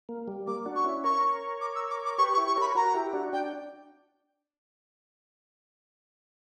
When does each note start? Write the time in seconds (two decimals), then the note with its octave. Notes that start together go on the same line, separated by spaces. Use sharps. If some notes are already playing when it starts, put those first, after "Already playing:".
0.09 A#3
0.28 G3
0.47 A#3 D6
0.66 D4 F#4
0.75 C#6
0.84 C#4 E4
1.04 A#4 C#5 C#6
1.61 D6
1.75 E6
1.90 D6
2.05 D6
2.18 G4 B4 C#6
2.33 C#6
2.37 E4 G4
2.47 C#6
2.56 A#4 C#5 B5
2.75 F#4 A#4 A#5
2.94 E4 G4
3.13 D4 F#4
3.33 D4 G5